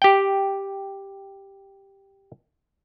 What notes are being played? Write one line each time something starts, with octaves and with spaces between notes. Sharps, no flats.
G4 G5